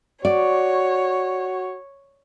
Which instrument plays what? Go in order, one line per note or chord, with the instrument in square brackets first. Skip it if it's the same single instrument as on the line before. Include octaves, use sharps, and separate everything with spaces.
[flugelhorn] F#4 [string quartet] C#5 [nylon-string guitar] D5